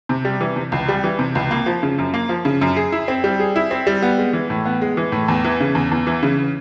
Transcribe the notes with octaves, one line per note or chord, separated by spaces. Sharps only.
C3
G3
E3
C3
C#2
G3
E3
C3
C#2
A#3
F3
C#3
F#2
A#3
F3
C#3
F#2
G#4
E4
C4
G3
G#4
E4
C4
G3
B3
G#3
E3
A2
B3
G#3
E3
A2
E2
E3
C#3
E2
E2
E3
C#3